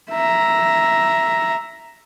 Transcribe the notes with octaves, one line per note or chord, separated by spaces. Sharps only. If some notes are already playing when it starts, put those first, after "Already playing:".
E5 A#5